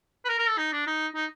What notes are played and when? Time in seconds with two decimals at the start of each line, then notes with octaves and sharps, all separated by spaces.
0.25 B4
0.29 A#4
0.39 A#4
0.49 A4
0.58 D#4
0.73 D4
0.87 D#4
1.15 D#4